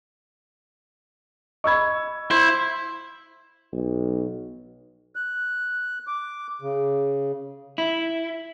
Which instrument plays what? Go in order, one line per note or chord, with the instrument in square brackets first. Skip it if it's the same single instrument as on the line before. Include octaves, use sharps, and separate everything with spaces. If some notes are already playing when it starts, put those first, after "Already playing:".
[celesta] D#5 B5 [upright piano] C#6 E6 G#6
[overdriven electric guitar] E4 [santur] C5
[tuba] B1
[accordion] F#6
D6
C#3
[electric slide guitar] E4